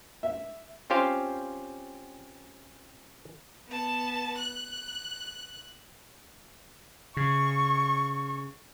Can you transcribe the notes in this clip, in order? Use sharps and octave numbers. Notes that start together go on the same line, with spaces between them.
E5
C4 C#4 F4 G4 C5 F5
B3 A5
F#6
C#3 C#6